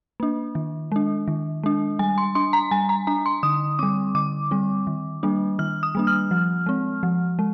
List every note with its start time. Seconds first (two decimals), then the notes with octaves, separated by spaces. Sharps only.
0.20 A#3 D4
0.55 D#3
0.92 G#3 D4
1.28 D#3
1.64 G#3 D4
1.99 G3 G#5
2.18 C6
2.35 D4 C6
2.53 A#5
2.71 G3 G#5
2.89 A#5
3.07 D4 A#5
3.26 C6
3.43 D3 D#6
3.79 G3 C4 D6
4.15 D3 D6
4.51 G3 C4
4.87 D#3
5.23 G3 A#3 D4
5.59 D#3 F6
5.83 D#6
5.95 G3 A#3 D4
6.07 F6
6.31 F3
6.66 G#3 C4
7.03 F3
7.39 G#3